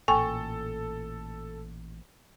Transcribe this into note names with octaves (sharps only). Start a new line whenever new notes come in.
A1 A#2 A4 G5 G#5 C#6